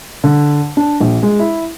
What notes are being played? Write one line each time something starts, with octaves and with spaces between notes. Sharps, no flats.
D3
D4
A#1
G#3
E4